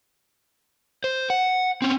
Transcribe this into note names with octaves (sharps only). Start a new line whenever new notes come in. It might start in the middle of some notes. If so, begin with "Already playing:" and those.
C5
F#5
C4 C#4